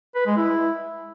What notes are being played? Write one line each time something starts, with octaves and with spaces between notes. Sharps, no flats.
B4
G#3
E4